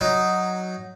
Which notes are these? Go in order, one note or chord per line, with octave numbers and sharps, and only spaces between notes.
F#3 D#4